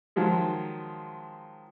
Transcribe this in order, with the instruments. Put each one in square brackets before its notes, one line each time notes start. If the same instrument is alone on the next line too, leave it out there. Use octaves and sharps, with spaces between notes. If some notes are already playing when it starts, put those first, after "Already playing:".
[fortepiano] D#3 F3 F#3 G#3